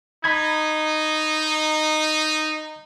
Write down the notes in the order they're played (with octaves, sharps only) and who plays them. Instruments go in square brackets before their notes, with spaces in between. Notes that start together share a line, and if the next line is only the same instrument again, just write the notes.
[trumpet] D#4 [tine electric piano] B5 G#6